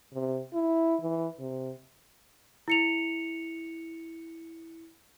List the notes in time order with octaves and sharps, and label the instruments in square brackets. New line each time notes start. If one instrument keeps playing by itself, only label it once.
[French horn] C3
E4
E3
C3
[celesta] E4 C#7 F7